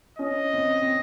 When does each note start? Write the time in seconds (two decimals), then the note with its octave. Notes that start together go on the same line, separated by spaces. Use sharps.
0.19 C#4 D#5
0.53 C4
0.82 C4